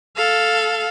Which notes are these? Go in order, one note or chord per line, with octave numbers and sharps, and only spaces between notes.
A4 F5